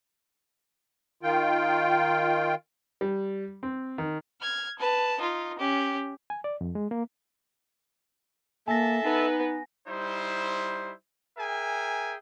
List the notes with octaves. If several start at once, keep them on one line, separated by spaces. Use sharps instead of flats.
D#3 F4 G5
G3
C4
D#3
F6 G#6
B4 A5
D#4 F4
C#4 G4
G#5
D5
F2
G#3
A#3
A#3 A4 E5 G#5 A5 A#6
B3 D#4 B4
G3 D#4 E4 C5
G#4 A#4 E5 G5 G#5